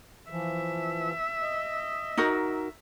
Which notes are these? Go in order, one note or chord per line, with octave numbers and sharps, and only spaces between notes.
E3 F3 E5
D#5
D#4 F#4 A#4